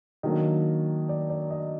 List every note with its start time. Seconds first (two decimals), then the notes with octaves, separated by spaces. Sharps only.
0.23 D#3 F#3 A#3 D4 D#5
1.09 D5
1.30 D5
1.51 D#5